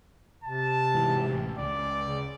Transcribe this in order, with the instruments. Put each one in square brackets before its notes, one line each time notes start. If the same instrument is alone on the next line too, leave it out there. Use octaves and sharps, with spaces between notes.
[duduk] C3 [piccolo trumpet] A5
[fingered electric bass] G#2 E3
A1
[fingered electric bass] C#2 [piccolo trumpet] D5
[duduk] C#3